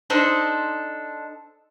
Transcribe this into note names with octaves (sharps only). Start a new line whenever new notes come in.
D4 D#4 A4 C5